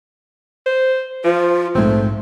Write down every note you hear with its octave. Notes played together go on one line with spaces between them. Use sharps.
C5
F3 F4
A#1 G#2 A3 C4